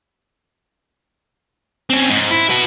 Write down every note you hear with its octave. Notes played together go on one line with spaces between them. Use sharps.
C4 C#4
G#2
E4
F#4 B4